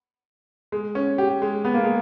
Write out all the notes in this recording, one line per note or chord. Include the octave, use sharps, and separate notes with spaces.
G#3
C#4
G4
G#3
B3
A#3
G#3